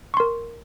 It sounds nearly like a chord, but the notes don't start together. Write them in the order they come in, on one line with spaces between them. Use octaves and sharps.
C#6 C6 A#4